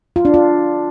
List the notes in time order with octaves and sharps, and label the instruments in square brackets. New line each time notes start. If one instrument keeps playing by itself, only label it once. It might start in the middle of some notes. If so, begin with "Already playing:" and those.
[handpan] F4
D4
F4